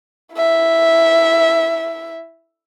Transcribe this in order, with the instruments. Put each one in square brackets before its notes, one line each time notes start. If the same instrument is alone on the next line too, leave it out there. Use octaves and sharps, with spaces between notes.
[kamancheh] E4 E5